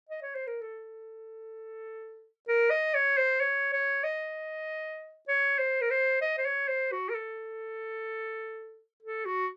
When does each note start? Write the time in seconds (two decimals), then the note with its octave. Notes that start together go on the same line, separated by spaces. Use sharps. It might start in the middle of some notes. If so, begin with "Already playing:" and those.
0.09 D#5
0.22 C#5
0.35 C5
0.47 A#4
0.61 A4
2.48 A#4
2.70 D#5
2.95 C#5
3.18 C5
3.41 C#5
3.73 C#5
4.04 D#5
5.28 C#5
5.59 C5
5.81 A#4
5.90 C5
6.21 D#5
6.38 C5
6.46 C#5
6.68 C5
6.92 F#4
7.09 A#4
7.15 A4
9.03 A4
9.25 F#4